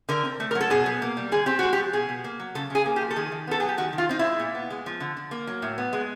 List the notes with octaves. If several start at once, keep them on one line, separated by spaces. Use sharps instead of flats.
D3 A#4
C4
A3
A#4
F#3
A4
B2 G#4
B2
A#3
G3
D3 G#4
C4 G4
G#3 F#4
G4
F3
B2 G#4
B2
A#3
F#3
C#3 A4
C#3 G#4
A#3
G4
F3
A4
D#3 G#4
D#3
B3 A4
F#3 G#4
G4
D#3 F#4
D#3
F4
C4 D#4
G#3 E4
A#2
B3
G#3
F3
D3
D3
A#3
F#3
A2
B3
G#3